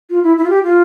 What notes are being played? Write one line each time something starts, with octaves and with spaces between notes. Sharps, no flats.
F4
E4
E4
F4
G4
F4